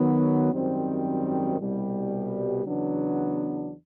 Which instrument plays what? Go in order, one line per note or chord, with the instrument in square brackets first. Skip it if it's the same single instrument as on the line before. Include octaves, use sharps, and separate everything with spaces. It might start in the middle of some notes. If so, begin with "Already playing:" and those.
Already playing: [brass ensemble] D#3 F#3 B3
G#1 F#2 D#3 G3 C4
C2 B2 G3
E2 C#3 F#3 B3 D4